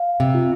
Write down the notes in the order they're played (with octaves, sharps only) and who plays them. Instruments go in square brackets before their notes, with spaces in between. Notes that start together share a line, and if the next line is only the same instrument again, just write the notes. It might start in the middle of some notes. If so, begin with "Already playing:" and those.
Already playing: [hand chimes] F5
[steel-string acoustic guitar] C3
[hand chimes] F4